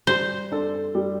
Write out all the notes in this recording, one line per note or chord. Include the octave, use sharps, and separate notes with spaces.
G3 C5
D4 A4
G3